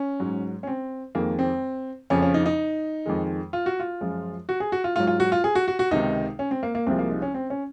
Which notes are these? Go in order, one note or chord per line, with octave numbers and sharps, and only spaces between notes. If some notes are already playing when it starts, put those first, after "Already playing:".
Already playing: C#4
G#2 F#3
C#4
C4
F2 D#3 G#3 A#3
C4
F2 C#3 F3 C#4
C#4
D#4
D#4
F2 D#3 G#3
F4
F#4
F4
F#2 F3 G#3
F#4
G#4
F#4
F4
G#2 F#3 F4
F4
F#4
F4
G#4
F#4
F#4
F#4
C#2 C3 D#3 D#4
C#4
C4
A#3
A#3
C2 C3 F3 G#3 C4
A#3
D#4
C#4
C4
C#4